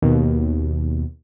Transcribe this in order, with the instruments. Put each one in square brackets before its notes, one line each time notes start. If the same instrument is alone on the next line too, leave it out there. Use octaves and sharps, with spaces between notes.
[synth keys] D#2 B2